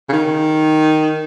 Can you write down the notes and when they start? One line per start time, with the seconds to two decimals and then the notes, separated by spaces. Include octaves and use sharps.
0.09 C#3
0.12 D#3